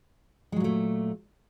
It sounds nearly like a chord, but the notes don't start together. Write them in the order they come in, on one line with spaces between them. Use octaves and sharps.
G#3 F#3 A#2 A3